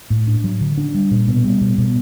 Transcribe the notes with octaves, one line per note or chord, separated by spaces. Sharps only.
A2
D4
F#3
D3
D4
G3
A#2
B2
G3
B2
B2